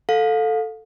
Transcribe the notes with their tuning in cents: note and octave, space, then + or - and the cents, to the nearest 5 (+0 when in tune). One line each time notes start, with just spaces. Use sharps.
A4 +0 F5 +30